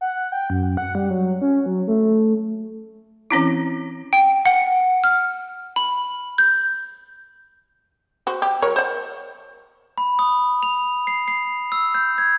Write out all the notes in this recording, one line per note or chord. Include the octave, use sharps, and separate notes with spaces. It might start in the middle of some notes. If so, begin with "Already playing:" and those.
F#5
G5
F#2
F#5
G3
F#3
C#4
F#3
A3
E3 C4 C#4 E4
G5
F#5
F6
B5
G6
F#4 C5
G4
F#3 A#4 C#5
C5 F#5
B5
D#6
F7
C7
C7
E6
G6
G#6